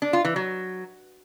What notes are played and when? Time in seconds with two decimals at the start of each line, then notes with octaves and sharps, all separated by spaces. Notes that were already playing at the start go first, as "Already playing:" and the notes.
0.02 D4
0.13 F4
0.25 E3
0.36 F#3